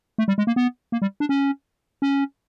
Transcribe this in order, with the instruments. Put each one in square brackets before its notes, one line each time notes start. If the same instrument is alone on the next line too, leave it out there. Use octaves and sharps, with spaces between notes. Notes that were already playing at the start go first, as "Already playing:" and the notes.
[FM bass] A3
G3
G#3
A#3
B3
A#3
G3
D4
C#4
C#4